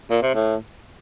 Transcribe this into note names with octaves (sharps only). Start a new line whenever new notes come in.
A#2
C3
A2